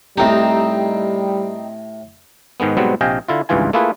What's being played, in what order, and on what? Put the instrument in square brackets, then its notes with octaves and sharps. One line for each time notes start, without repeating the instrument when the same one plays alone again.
[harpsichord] A2 G4 [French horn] G3 [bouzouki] C4 D#4
[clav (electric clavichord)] G#2 D#3 G#3 B3
G#2 B2 F#3 G3 B3 C4
A#1 C3 D#5 F5 G5 G#5
D3 E4 F4
G#1 C#2 G2 E3 F4 G#5
A3 A#3 E4 F4 G#4 B4